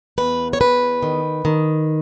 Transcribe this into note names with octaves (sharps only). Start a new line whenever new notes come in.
E2 B4
C#5
E2 B4
D#3
D#3